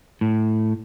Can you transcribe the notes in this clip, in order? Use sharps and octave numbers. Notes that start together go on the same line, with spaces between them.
A2